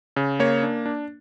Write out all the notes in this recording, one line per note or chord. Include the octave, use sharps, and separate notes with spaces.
C#3
A#3 C#5
D4
D4